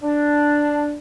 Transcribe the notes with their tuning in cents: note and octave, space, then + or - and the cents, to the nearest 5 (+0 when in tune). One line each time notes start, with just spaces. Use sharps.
D4 +0